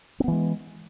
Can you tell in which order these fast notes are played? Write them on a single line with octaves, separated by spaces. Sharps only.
C4 B3 E3 G#3